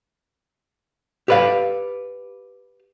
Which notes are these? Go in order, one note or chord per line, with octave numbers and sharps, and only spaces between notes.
G4 A4 B4 D5 F5